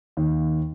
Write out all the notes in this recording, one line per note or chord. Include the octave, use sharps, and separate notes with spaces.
D#2